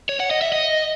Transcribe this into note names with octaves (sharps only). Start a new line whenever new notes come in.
C#5
F#5
D#5
E5
D#5